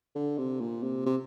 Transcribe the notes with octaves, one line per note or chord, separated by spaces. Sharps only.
D3
C3
A#2
C3
C3